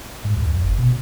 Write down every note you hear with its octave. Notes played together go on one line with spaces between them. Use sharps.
G#2
D2
F#2
G1
B2